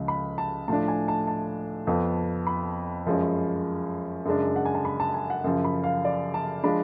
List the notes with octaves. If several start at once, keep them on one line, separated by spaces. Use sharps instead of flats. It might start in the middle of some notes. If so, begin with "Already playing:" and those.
Already playing: C#2 C#3 F3
B5
A5
A2 F3 A3 D4 A5
G#5
A5
A5
F2 F3 B3
B5
F#2 F3 G#3 C#4
F#2 C#3 G#3 D4
F#5
G#5
A5
B5
A5
G#5
F#5
F#2 C#3 F3
B5
F5
D5
A5
F3 G#3 D4 B5